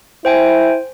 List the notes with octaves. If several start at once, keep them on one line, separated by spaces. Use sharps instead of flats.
E4 C5 G5 G#5